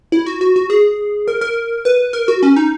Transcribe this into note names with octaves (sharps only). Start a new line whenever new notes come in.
E4
F#4
F#4
F#4
G#4
A#4
A#4
B4
A#4
F#4
C#4
D#4